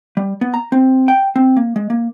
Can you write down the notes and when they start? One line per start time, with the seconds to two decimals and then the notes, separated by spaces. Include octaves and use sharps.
0.17 G3
0.41 B3
0.54 A#5
0.72 C4
1.08 G5
1.36 C4
1.57 A#3
1.76 G#3
1.90 A#3